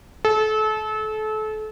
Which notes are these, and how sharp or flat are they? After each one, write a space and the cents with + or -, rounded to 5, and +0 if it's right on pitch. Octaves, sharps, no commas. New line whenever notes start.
A4 -30